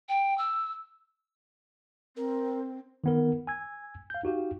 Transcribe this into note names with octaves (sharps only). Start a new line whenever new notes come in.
G5
E6
C4 A#4
D#3 B3 A#4
G#5 E6 G#6
F5 G6
D#4 F#4 G4 F5